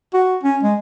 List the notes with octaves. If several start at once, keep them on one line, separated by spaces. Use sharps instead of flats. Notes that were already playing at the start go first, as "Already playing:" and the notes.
F#4
C#4
G#3